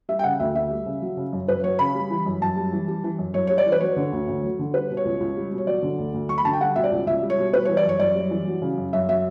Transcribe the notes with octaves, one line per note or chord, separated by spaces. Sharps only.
G3 E5
G5
C#3 F#5
D2 E5
D2 E5
G3
C#3
F#3
C#3
F#2
F#2 B4
F#3 C#5
C#3 B5
G3
E3
F#2
F#2 A5
G3
E3
G3
E3
F#2
F#2 C#5
G3 C#5
D5
E3
B4
F#3 C#5
D3
D2
D2
F#3
D3
G3 B4
B2
C#5
C#2
C#2
G3
B2
C#5
F#3 D5
D3
D2
D2
F#3 C#6
B5
D3 A5
G5
G3 F#5
B2 E5
D5
C#2
C#2 E5
G3
C#5
B2
G3 B4
C#5
E3
D5
F#2 C#5
F#2 D5
G3
E3
F#3
C#3
F#2
F#2 E5
F#3 E5